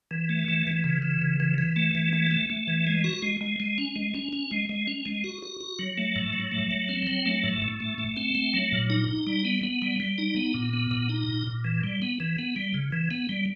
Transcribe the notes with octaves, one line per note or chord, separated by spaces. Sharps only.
E3
A3
E3
E3
C#3
E3
C#3
E3
E3
A3
E3
A3
A3
A3
E3
G#3
F#4
G#3
G#3
G#3
C#4
G#3
C#4
C#4
G#3
G#3
C#4
G#3
F#4
F#4
F#4
F#3
A3
A2
F#3
A3
F#3
C4
F#3
A3
A2
A2
A3
A3
C4
A3
F#3
A#2
D#4
D#4
G3
B3
B3
G3
G3
D#4
B3
A#2
B3
A#2
D#4
A#2
A#2
E3
G3
B3
E3
B3
G3
C#3
E3
B3
G3